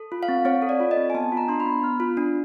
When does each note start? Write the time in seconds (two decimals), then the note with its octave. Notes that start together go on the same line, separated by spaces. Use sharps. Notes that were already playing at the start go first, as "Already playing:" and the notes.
Already playing: A4
0.12 F4
0.23 F5
0.29 C4
0.45 C4 C#5
0.62 A4
0.69 D5
0.80 F4
0.91 D#5
0.97 C4
1.10 G#5
1.14 B3 A5
1.32 F4
1.37 A#5
1.48 D4 C6
1.60 B5
1.65 B3
1.83 B3 F6
2.00 F4
2.17 D4